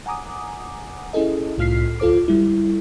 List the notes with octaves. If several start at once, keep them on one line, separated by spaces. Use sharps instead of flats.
F#5 G#5 A#5 D6 D#6
C#4 E4 G#4 A4 D#5
C2 A2 F4 F6 B6 C7
D2 F4 A4 C5 D6
G3 E4